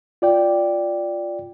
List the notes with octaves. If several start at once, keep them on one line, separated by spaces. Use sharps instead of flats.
F4 D5 G5